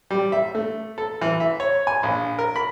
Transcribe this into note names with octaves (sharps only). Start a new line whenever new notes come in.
G3
E5
A3
A4
E3
E5
C#5
G#5
A#1
A#4
B5